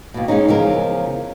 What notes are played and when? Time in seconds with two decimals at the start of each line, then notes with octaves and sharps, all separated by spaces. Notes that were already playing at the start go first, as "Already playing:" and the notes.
0.14 D#2 B2
0.28 G#3 C4 C#4 D#4
0.48 E2 C#3 F3 A#4